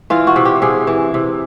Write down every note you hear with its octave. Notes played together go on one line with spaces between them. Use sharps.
E3 F4
F#4
C3
G4
C3 G#4
E3
C3